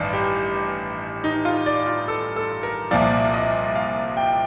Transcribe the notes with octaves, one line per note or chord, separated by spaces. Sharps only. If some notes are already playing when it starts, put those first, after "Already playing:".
Already playing: A1 G2 D#3 D5
G4
D#4
F4
D5
F4
A4
A4
A#4
C2 A#2 F3 D5
D#5
F5
G5